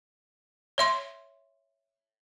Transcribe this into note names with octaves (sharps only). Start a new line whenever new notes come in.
C#5 E5 C6